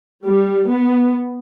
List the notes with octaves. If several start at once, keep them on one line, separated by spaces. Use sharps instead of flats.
G3
B3